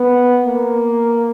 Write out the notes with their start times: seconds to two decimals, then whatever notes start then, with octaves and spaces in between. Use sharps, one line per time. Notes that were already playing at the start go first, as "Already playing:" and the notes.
Already playing: B3
0.45 A#3